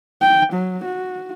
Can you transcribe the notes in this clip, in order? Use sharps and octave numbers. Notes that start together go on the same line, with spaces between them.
G5
F#3
F#4